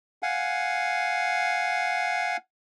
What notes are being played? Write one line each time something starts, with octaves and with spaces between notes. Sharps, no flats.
F5 F#5 G#5